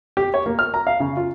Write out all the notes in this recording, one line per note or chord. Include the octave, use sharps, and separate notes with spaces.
G4
C#5
A#3
F6
A#5
F5
C#3
F4